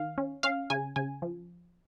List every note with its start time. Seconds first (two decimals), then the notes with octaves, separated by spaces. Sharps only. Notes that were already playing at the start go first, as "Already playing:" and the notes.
Already playing: D#3 F5
0.18 C#4
0.43 C#4 F5
0.70 C#3 G#5
0.96 C#3 G#5
1.22 F3